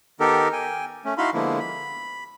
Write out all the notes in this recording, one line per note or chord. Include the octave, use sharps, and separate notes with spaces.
D#3 B3 D#4 G4 A4 A#4
G5 G#5
A3 C#4
D#4 E4 F#4 F5 B5 C6
D3 F3 G#3 A#3 B3 E4
B5